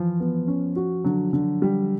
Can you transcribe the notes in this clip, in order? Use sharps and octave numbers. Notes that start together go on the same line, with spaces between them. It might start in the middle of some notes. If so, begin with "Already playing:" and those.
Already playing: E3 F3
B3
C#4
F#4
D3 F#3
D3
G3